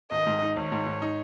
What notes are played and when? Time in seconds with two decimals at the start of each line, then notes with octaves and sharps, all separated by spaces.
0.11 G#1 D#5
0.26 G#2
0.42 D#4
0.56 G#1 C#5
0.72 G#2
0.86 G#2
1.02 D#4